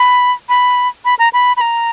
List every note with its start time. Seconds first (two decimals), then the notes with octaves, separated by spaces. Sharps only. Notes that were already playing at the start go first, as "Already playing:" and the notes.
Already playing: B5
0.49 B5
1.05 B5
1.19 A#5
1.33 B5
1.57 B5
1.61 A#5